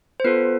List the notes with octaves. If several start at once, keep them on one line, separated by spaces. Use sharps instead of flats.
C5
B3 F4 A4 B4